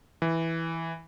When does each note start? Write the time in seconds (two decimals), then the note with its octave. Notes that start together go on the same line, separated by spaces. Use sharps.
0.22 E3